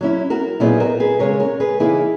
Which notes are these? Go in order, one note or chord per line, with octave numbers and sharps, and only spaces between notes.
F#3 C#4 E4
F#4 A#4
A#2 F#3 B3 D#4 E4 G#4
F#4 A#4
G#4 B4
C#3 G#3 C#4 A#4 C#5
A#4 C#5
G#4 B4
C#3 E3 A#3 D#4 E4 G#4